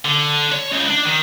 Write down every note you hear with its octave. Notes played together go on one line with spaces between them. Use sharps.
D3
C#5
C#2
D4
D#3